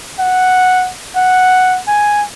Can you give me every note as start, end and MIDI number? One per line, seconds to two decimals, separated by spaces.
0.19 0.90 78
1.16 1.79 78
1.87 2.24 80